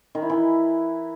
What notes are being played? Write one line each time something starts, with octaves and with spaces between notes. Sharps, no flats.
D#3
E4
E3